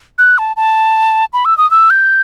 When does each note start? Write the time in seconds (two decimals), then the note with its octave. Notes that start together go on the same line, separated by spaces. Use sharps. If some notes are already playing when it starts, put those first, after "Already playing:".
0.18 F#6
0.38 A5
0.57 A5
1.33 B5
1.45 E6
1.58 D#6
1.71 E6
1.90 G6